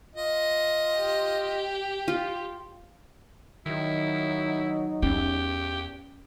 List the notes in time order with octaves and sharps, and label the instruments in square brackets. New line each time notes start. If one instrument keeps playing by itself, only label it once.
[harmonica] F4 D#5
[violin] G4
[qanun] F4
[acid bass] D#3 [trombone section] F#3 D#4 [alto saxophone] E4
[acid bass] E2 [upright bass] C#4 [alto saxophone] G4